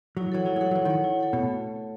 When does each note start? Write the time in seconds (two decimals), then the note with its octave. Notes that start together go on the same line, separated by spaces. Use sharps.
0.17 F#3 E4
0.32 E3 A4 C#5 F#5
0.46 F#3 E4
0.56 G#3
0.61 F#3 A4 C#5 F#5
0.71 F#3
0.75 E3 E4
0.85 D#3
0.90 A4 C#5 F#5
1.04 E4
1.19 A4 C#5 F#5
1.33 B2 A3